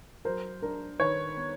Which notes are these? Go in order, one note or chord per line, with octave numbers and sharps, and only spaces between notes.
F#3 A#4 C5
D4 A#4
D#3 B4 C#5
B3